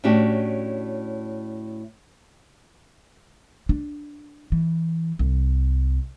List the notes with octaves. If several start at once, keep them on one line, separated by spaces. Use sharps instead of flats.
A2 C#4 D4 F#4 G4
D4
E3
C2